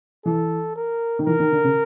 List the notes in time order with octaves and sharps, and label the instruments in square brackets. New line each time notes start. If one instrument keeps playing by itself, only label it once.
[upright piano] E3 [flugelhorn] A4
[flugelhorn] A#4
[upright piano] D#3
[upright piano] E3 [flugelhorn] A#4
[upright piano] D#3
D3
C#3